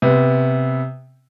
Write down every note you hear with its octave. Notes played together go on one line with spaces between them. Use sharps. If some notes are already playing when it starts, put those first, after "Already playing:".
C3 B3